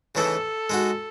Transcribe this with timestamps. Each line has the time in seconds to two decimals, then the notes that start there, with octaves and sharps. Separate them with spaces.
0.15 C#3 E3 A3 D#4 A4
0.70 G#3 D#4 F#4